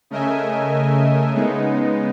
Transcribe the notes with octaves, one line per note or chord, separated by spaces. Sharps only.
C#3 A3 A#4 D#5 E5 G#5
C#3 G#3 B3 D#4